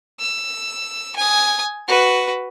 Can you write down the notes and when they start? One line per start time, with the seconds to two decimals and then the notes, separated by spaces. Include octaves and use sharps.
0.20 E6
1.16 G#5 D#6
1.88 F#4 B4